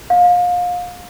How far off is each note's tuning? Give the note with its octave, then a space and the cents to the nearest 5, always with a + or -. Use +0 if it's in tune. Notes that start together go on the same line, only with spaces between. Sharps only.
F5 +30